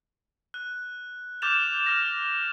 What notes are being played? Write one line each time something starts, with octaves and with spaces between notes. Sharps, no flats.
F#6
D6 F6 G6 A6 E7 F7
F6 A#6